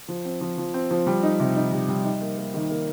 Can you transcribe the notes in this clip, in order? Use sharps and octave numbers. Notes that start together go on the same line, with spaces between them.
F3
C4
F3
F3
C4
F3
G3
D#4
C3
D#4
G3
G3
D#4
A#3
A#3
D#3
A#3